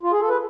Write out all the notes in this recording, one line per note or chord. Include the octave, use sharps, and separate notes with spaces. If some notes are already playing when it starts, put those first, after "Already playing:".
F4
G#4
A4
B4